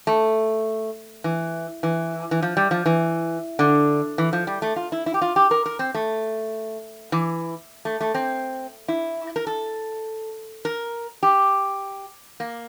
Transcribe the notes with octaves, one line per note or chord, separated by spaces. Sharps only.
A3
E3
E3
E3
F3
G3
F3
E3
D3
E3
F3
G3
A3
F4
E4
E4
G4
F4
G4
A#4
A#4
C4
A3
E3
A3
A3
C4
E4
A#4
A4
A#4
G4
A#3